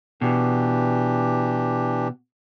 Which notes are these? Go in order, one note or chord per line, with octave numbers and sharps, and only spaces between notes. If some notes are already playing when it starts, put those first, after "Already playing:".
B2 E3 D4 G4